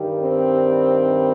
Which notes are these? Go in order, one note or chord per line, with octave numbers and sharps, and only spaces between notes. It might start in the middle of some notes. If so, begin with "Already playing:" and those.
Already playing: G2 D#3 G3
C4